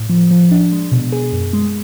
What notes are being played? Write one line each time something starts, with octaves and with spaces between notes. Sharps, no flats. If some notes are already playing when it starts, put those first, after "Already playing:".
Already playing: A2
F3
F3
D4
G#3
B2
G#4
F#2
G#3